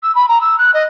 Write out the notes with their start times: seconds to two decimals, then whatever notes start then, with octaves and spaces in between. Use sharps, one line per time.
0.03 E6
0.15 B5
0.29 A#5
0.41 E6
0.59 F#6
0.74 D#5